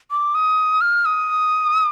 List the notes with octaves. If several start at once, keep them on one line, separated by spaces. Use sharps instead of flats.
D6
D#6
F6
D#6